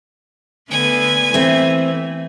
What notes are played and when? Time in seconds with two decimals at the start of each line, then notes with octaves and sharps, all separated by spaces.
0.71 D3 A3 B3 G#5
1.34 E3 A3 C4